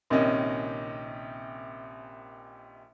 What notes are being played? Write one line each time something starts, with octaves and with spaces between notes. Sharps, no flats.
A#1 C3 D#3 C#4 D#5